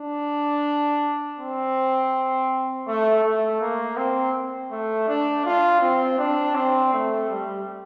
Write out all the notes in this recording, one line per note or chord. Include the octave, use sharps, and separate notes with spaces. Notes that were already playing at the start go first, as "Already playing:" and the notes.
Already playing: D4
C4
A3
A3
A#3
C4
A3
D4
F4
C4
D4
C4
A3
G3